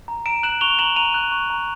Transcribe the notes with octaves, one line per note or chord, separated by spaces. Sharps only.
A#5
A#5 D7 E7
F#6 E7 F#7
C#6 F7 G7
A#5 E7 F#7
A#5 D#7 F7
F#6
C#6
A#5